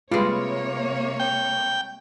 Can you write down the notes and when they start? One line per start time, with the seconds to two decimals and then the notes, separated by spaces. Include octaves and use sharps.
0.12 C3 G3 G#3 A#3 F4 B4 C#5
1.20 G5